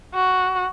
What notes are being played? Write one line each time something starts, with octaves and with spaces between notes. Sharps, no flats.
F#4